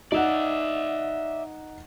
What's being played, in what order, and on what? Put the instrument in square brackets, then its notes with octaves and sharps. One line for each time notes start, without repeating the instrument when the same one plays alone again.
[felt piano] D#4 F#5 [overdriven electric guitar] D5 E5